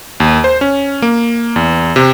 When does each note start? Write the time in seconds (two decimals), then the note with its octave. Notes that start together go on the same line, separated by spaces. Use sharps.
0.20 D#2
0.44 C5
0.61 C#4
1.02 A#3
1.56 E2
1.96 C3